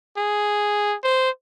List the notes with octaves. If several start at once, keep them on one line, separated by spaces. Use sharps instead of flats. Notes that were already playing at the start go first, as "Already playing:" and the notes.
G#4
C5